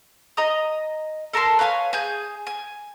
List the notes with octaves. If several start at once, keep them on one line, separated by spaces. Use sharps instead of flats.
D#5 A#5 D#6
A4 A#4 A5 C6
B4 C#5 F5 G#5
G#4 G#5 G6
G#5